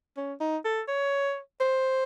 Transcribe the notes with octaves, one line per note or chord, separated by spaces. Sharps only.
C#4
D#4
A4
C#5
C5